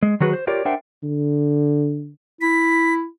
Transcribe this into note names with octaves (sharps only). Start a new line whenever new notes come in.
G#3
D#3 F#3 F#4 G#4 B4
C5
F4 G4 A#4 C#5 D5
D4 A#4 C5 E5 F#5 G5
D3
E4 B6